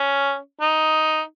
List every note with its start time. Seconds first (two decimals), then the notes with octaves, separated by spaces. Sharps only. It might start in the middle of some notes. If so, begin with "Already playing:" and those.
Already playing: C#4
0.61 D#4